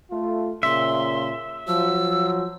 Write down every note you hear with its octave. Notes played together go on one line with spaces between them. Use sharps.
A3 F4
A#2 C#3 E5 C6
F3 F#3 E6